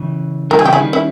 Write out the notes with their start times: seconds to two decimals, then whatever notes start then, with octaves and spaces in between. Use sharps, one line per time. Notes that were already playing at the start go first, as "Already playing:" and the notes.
Already playing: C#3 E3
0.50 D#3 G3 A#4
0.59 G#4
0.65 C#3 E3 G4
0.73 E4 G#4
0.79 D#3 G3
0.93 C#4 E4